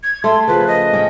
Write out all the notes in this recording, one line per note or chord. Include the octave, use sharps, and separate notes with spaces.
G#6
A3 C6
C#3 F3 B4
D#5
C#4 C#5 G5